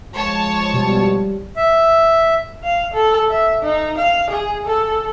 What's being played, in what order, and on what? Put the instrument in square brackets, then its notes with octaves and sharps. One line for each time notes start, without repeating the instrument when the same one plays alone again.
[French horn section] F3 G#3 [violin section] C#5 A5
[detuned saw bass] B2 [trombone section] G3
[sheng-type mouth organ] E5
[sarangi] F5
A4
E5
D#4
F5
G#4
A4